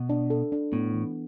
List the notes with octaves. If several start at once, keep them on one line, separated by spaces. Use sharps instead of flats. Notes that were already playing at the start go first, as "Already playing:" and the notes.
Already playing: B2
D4
A4
D4
A2 B3
E3